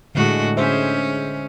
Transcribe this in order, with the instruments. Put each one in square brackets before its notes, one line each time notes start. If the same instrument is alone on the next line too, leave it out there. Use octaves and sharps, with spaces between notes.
[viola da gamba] A2 F#4 [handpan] D3 G#3
[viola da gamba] C#4 [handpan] G#4 C5 E5